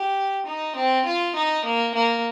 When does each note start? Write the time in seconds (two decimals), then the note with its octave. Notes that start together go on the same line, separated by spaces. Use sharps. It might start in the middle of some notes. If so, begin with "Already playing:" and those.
Already playing: G4
0.46 D#4
0.76 C4
1.05 F4
1.36 D#4
1.65 A#3
1.95 A#3